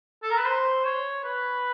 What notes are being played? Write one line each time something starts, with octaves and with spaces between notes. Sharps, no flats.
A4
A#4
B4
C5
C#5
B4